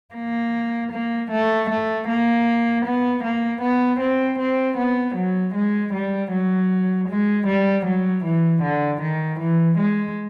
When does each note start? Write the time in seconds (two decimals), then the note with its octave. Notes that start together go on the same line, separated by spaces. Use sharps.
0.15 A#3
0.92 A#3
1.31 A3
1.70 A3
2.08 A#3
2.85 B3
3.23 A#3
3.61 B3
4.00 C4
4.39 C4
4.77 B3
5.15 F#3
5.54 G#3
5.94 G3
6.32 F#3
7.09 G#3
7.47 G3
7.86 F#3
8.24 E3
8.63 D3
9.02 D#3
9.40 E3
9.78 G#3